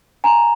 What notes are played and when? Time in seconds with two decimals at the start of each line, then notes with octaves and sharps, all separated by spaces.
0.24 G#5 A#5